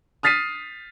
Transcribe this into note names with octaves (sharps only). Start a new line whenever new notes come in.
D#6 F6 A6 B6 C7 D#7